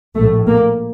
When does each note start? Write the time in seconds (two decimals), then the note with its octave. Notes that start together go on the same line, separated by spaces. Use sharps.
0.15 A#1 A2 A3
0.47 A#3